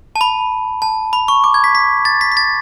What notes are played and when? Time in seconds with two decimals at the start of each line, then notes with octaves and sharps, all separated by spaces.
0.16 A5
0.21 B5
0.82 A5
1.13 B5
1.28 C#6
1.44 D6
1.54 G#6
1.64 B6
1.75 B6
2.05 A6
2.21 B6
2.32 B6
2.37 A6